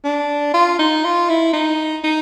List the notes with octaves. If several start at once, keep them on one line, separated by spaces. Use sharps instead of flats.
D4
F4
D#4
F4
E4
D#4
D#4